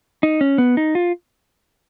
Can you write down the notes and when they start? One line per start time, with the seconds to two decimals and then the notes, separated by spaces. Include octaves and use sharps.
0.23 D#4
0.41 C#4
0.58 B3
0.77 D#4
0.95 F4